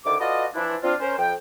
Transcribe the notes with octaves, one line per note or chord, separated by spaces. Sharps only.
D2 D3 D#3 E4 D6
F4 F#4 A4 B4 D5 D#5
E3 F3 D4 E4
C4 D4 F4
C#4 A#4 C5
F2 G5